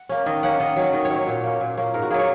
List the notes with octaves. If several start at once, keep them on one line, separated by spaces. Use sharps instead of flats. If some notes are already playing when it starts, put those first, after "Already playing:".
Already playing: F#5
A#3 C#4
D#3 D#5
A#3 C#4 F#5
D#3 D#5
F#3 C#4
D#3 D#5
C#5
F#3 C#4
C#5
A#2
A#3 C#4
A#2
A#3 C#4
G#2 A#4
F#4
F#3 A#3 G#4
C#5